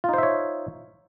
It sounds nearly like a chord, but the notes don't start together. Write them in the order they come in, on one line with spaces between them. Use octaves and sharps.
F4 D#4 C5 E5 C#5